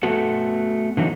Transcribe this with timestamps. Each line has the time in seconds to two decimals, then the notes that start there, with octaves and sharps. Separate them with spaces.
0.03 A3 B3 F#4 A4
0.97 D3 E3 F#3 D#4